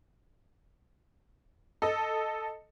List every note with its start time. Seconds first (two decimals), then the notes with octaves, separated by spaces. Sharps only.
1.82 A4 D#5